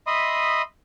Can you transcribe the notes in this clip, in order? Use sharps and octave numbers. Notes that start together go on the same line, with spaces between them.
D#5 E5 B5 C6 D#6